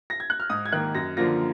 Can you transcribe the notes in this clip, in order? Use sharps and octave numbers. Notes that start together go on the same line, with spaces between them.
A#6
G#6
F#6
F6
G#2 D#6
G#6
D#3 A#3 F#6
F#2 A#6
D3 F3 A#3 F4 A#6